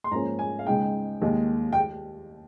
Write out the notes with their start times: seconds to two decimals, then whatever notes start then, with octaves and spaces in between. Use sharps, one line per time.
0.04 C6
0.11 G#2 F3 A#3 C#4 A#5
0.39 G#5
0.59 F5
0.67 C#2 C#3 G#3 D#4 G5
1.22 D#2 D#3 G#3
1.73 G5